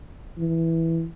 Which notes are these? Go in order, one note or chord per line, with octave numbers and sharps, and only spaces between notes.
E3